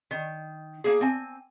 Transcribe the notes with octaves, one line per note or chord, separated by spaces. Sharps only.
D#3
A#3 G#4
C4 G#5